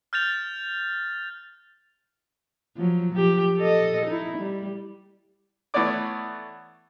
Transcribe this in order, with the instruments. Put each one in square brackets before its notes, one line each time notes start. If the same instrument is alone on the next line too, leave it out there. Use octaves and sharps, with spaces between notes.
[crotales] F6 G6 A6 F7
[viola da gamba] F3 F#3
F3 G4
A4 D#5
D#4 E4
G3
[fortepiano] E3 A3 B3 C#5 D5 D6